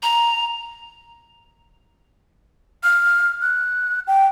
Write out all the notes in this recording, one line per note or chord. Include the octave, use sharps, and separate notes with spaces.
A#5
F6
F#6
G5